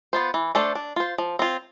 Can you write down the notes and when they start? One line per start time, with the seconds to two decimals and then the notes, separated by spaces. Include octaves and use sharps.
0.13 B3 F4 C5
0.34 E3
0.55 A3 D4 A4 C5
0.75 D4
0.96 F4 C5
1.18 F3
1.39 C4 F4